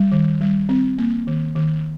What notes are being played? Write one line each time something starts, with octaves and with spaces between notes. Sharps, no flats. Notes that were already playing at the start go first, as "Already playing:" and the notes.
Already playing: G3
D#3
G3
C4
A#3
D#3
D#3